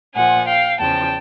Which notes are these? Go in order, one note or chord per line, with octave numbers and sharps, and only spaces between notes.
A#2 F3 F#5 G#5
F5 G5
E2 C#3 F3 G5 A5